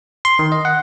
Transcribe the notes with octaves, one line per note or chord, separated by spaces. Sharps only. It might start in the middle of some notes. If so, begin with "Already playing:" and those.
C6
D#3
D#5
F#5